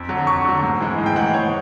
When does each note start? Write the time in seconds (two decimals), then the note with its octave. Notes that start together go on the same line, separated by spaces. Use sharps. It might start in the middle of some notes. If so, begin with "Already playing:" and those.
Already playing: F2
0.09 D3 F#3
0.27 F2 C#6
0.45 D3 F#3
0.63 G#2
0.81 E3 G#3
0.99 G#2
1.06 G5
1.16 E3 G#3 F#5
1.34 G#2 C#5